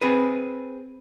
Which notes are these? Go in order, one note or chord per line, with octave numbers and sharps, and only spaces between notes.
C4 G#4 B4